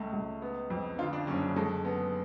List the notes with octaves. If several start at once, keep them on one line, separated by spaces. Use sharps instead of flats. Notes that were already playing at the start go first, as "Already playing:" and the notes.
Already playing: C#2 A3
C#2
B3
F2
D3 F4
D4
F#1 C#4
D4
G#3 A4
B3